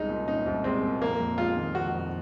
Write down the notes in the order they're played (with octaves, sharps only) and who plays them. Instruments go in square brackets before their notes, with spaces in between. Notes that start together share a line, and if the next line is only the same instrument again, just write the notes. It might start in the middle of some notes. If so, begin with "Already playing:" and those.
Already playing: [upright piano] C2 G#3 C#4 [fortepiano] D#4
[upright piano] A#2
[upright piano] C#4 [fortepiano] D#4
[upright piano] C2
[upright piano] G#3 [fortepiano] C4
[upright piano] A#2
[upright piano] F2 [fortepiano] A#3
[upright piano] F2
[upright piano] G#3 [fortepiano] F4
[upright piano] D#3
[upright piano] F2 [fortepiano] F#4
[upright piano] F2